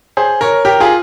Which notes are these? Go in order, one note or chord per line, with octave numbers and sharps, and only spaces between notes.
G#4 C5
A#4 C#5
G4 A#4
F4 G#4